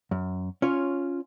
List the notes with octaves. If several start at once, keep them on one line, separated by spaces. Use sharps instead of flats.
F#2
C#4 F4 C#5